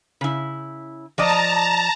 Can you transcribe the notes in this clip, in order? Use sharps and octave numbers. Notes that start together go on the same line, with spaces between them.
C#3 E4
F3 D5 D#5 A5 A#5